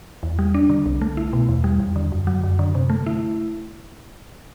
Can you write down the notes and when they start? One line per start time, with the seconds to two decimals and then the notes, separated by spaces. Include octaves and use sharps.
0.23 E2
0.39 G3
0.54 D4
0.70 D3
0.86 C2
1.01 A3
1.17 E4
1.33 B2
1.49 E2
1.64 G3
1.80 E2
1.96 D3
2.12 F#2
2.27 F#3
2.44 F#2
2.59 D3
2.75 C3
2.90 A3
3.07 E4